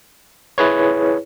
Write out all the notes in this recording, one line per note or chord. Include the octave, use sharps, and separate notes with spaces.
E4 G#4 B4 C#5